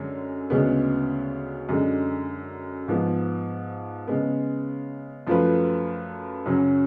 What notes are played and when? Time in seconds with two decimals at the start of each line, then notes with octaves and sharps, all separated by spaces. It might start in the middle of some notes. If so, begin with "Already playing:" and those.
Already playing: F#2 D3 G#3 C#4
0.50 D2 C#3 G#3 B3
1.69 F#2 D3 G#3
2.88 G#2 F3 B3
4.08 C#3 G#3 B3
5.27 F#2 F3 A3 F4 B4
6.46 F#2 C#3 F#3 C#4